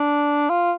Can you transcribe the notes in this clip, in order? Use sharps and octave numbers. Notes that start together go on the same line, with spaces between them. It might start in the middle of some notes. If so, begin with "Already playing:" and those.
Already playing: D4
F4